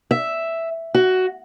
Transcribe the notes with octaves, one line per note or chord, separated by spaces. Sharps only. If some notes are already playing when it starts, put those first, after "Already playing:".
E5
F#4